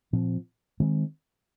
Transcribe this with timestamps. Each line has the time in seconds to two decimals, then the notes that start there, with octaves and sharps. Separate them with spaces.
0.13 A#2 F3 C4
0.80 D#3 G#3 C4